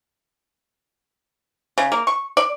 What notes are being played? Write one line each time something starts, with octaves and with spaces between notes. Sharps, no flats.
C#3
A#3
C#6
D5